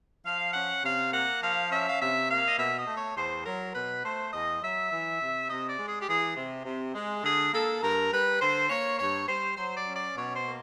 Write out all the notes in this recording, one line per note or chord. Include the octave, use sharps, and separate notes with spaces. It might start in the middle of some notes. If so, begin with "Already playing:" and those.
F3 F5
C#4 F#5
C3 F5
A#3 F#5
F3 F5
C#4 E5
F5
C3 E5
A#3 F5
D#5
B2 E5
D#5
A3
C#5
E2 C5
F#3 A#4
B2 B4
A3 C5
E2 D#5
F#3 E5
E3
C3
C3 D#5
D5
G#3
G#4
G4
E3 G#4
C3
C3
G#3
D3 G#4
A#3 A4
G2 A#4
G3 B4
D3 C5
A#3 C#5
G2 C#5
G3 C5
F#3 C5
D5
C#4
D5
B2 C#5
C5
A#3